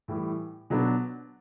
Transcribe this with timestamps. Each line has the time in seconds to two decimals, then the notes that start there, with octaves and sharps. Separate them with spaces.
0.08 A2 E3 G3
0.70 B2 F#3 B3 D4